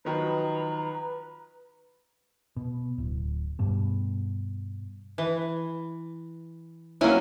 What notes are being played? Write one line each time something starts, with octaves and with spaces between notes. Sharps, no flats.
D#3 F3 F#3 B4 A#5
B2
D1
G2 B2
E3
F#3 A#3 C#4 E4 G#5